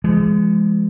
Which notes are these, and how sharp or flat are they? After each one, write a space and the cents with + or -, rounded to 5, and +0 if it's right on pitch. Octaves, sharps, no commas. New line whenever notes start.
F3 -45 G#3 +0